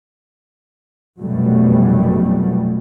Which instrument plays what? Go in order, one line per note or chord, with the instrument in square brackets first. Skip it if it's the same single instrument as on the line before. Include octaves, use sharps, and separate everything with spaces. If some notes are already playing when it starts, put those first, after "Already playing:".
[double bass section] F1 F#2 B2 F#3 G3 A3